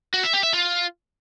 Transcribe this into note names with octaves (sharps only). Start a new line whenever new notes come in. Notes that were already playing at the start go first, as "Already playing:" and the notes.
F#4
E5
G4
E5
F4